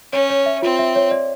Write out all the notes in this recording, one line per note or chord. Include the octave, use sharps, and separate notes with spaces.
C#4 C#5
C#5
E5
C4 F4
E5
C#5
D5